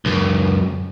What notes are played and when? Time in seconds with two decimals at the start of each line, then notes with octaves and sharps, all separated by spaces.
0.05 C#2 F#2